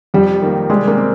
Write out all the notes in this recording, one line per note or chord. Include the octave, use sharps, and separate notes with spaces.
F2 G3
D#3 A#3
G3 G#3
A#3
C4